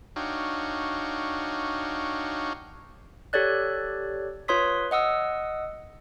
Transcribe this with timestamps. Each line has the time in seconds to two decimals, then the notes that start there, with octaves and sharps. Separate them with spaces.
0.16 D4 D#4 F#4 C#5 F5 G5
3.33 G4 A4 C#5 D5 F#6
4.48 F4 B4 C#5 C6 D#6 B6
4.91 D#5 F#5 D#6 E6